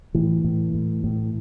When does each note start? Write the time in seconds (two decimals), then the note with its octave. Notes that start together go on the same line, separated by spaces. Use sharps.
0.14 A2 E3
0.44 A2
0.74 A2
1.04 A2